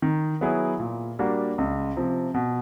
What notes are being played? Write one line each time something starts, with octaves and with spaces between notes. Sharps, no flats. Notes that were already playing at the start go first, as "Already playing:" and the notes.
D#3
F#3 B3 E4 G#4
A#2
G3 A#3 D4 F#4
C#2
C3 F3
B2